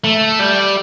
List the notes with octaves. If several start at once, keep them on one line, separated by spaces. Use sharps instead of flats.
A3
G3